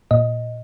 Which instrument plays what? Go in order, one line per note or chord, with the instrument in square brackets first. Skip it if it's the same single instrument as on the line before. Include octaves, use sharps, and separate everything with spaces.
[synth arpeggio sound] A#2 D#5